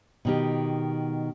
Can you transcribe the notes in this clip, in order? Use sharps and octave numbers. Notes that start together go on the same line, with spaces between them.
B2 D#3 G4